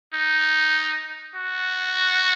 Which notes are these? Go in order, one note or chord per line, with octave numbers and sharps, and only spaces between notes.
D#4
F#4